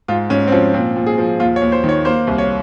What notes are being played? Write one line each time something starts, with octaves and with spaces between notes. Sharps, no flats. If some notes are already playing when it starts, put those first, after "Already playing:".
G#2 F4
G#2 C#4
C4
F3 C#4
A#2 C4
A#2
G#4
F3
D#2 F4
C#5
D#2
C5
D#3
C#5
A#3 C5
C2
C#5